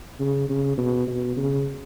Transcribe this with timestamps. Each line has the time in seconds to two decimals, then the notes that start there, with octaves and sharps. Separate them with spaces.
0.20 C#3
0.49 C#3
0.78 B2
1.07 B2
1.37 C#3